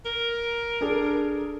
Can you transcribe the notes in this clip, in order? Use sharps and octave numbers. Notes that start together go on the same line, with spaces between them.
A#4
D4 G#4 A4